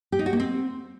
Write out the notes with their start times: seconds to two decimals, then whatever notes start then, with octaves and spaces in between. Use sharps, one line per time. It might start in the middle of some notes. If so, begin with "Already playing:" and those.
0.12 G4
0.19 D#4
0.26 F#4
0.33 A#3
0.40 C4